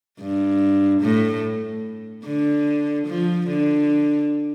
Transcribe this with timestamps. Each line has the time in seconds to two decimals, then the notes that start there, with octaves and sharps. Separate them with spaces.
0.20 G2
1.02 A2
2.25 D3
3.07 F3
3.48 D3